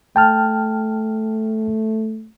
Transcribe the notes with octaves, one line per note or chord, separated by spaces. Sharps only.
A3 G5 A5 F6